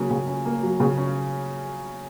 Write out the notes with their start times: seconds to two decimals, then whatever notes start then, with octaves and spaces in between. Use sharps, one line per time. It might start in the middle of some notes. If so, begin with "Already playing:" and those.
Already playing: C#3 F#3 A#3 C#4
0.10 C#3
0.27 C#4
0.45 A#3
0.63 F#3
0.80 C#3
0.98 C#4